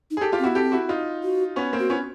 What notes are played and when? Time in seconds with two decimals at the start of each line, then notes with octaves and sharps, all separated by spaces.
0.11 D#4
0.17 G#4
0.21 G4 A4
0.32 F4 G4
0.39 C4
0.44 B3 E4 F#4
0.55 C4 G4 A4
0.72 E4 F#4
0.89 D#4 F4
1.23 F#4
1.56 B3 C#4
1.73 A#3 C4
1.79 F#4
1.90 B3 C#4 F4